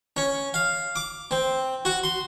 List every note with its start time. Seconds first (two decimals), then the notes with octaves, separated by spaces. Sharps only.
0.17 C#4
0.54 F5
0.96 D6
1.31 C4
1.85 F#4
2.04 C6